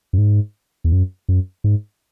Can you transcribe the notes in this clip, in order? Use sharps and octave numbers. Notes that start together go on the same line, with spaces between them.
F#2
G#2
E2
F#2
F#2
G#2